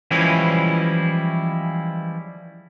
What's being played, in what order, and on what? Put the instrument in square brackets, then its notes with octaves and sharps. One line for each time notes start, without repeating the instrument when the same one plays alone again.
[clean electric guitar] E3 F3 G3 G#3 C#4 E4